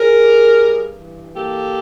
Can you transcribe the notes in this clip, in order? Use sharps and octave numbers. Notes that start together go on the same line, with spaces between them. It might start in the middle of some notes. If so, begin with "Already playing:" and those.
Already playing: G#4 A#4
G3
G2
E3
A#3 G4 A4